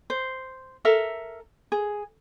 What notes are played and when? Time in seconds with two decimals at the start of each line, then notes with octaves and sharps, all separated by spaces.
0.10 C5
0.85 A4 A#4 E5
1.72 G#4